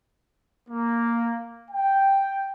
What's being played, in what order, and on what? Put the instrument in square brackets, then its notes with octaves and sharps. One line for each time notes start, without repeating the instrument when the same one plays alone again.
[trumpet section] A#3
G5